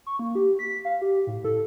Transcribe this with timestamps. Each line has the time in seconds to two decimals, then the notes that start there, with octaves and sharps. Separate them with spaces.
0.06 C#6
0.19 A#3
0.35 G4
0.59 B6
0.85 F5
1.02 G4
1.27 A2
1.44 A4